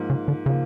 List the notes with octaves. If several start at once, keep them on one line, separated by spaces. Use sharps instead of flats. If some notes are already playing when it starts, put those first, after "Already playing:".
Already playing: G#2 F3 A#3
C#3
D3
C#3 F3 A#3